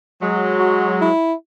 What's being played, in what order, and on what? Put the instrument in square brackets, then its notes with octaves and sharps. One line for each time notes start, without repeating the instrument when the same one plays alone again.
[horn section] F#3 G#3
[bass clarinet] F#4
E4